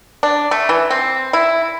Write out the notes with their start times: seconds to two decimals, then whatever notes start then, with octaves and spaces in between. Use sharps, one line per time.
0.23 D4
0.51 A3
0.69 E3
0.90 C4
1.33 E4